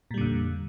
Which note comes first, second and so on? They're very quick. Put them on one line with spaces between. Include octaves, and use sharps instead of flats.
A#2 G3 D3 F2